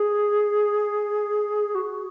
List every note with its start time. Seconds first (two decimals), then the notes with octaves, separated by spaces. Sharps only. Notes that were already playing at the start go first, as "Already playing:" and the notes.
Already playing: G#4
1.75 F#4